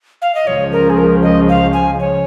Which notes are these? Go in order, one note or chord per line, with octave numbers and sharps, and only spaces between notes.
F5
D#5
C#2 C#3 F3 C#5
A#4
G#4
A#4
D#5
F5
G#5
C#5